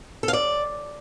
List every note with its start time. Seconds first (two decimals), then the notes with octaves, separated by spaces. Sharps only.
0.23 A4
0.28 F5
0.33 D5